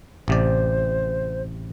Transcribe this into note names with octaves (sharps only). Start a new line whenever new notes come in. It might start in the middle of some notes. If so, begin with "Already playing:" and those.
A1 C3 C5 D5